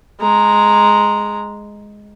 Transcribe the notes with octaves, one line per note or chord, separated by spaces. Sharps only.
G#3 A#5